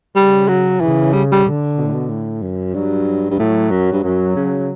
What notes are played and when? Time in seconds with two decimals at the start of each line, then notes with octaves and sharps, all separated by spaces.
0.16 C#3 G3
0.48 F#3
0.81 C#3 E3
1.13 G3
1.32 G3
1.46 D3
1.78 B2
1.85 A2
1.93 B2
2.10 A2
2.42 F#2
2.74 G2 F#3
3.31 G2
3.39 A2 F#3
3.71 F#2
3.92 G2
4.04 F#2 F#3
4.36 C#3